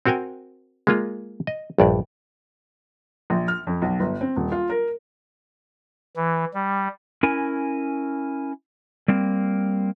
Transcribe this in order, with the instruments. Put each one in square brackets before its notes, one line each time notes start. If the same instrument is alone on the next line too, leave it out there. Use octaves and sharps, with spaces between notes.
[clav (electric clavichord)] C4 F#4 A#4 G5 G#5
G#3 A#3 F4
D#5
A#1 G2 D5
[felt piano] A#1
F6
F2
B1
G1
C4
D#1
F4
A#4
[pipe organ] E3
G3
[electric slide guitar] C#4 E4 A#4 G#5
G3 A#3 C4